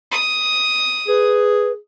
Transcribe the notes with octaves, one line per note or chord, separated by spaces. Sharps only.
D#6
G#4 B4